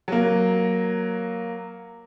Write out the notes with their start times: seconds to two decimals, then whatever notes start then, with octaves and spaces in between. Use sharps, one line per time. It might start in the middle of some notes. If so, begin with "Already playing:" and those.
0.08 F#3 A#3